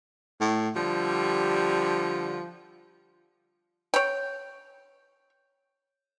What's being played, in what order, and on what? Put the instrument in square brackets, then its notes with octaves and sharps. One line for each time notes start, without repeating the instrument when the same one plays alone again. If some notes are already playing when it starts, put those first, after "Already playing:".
[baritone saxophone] A2
[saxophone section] D3 G3 [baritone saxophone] F3
[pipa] C#5 G5